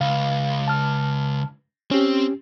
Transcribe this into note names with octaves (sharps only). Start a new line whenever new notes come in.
C#2 F5
A5 F6
C4 C#4 G4